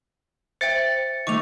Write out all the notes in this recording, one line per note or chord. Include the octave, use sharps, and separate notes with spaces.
C5 E5 G5 A6 C#7
D#3 A3 C#6 D6 F7